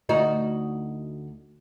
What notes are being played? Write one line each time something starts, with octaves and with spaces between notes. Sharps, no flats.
D2 D#4 F#4